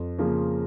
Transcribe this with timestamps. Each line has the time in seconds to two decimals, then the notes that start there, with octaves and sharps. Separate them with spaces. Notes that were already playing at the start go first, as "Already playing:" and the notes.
Already playing: F2
0.18 C#3 F3 A#3